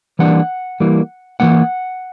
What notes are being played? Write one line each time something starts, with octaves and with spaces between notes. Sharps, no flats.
E3 G3 A#3 D4 F#5
E3 G3 A#3
E3 G3 A#3 F#5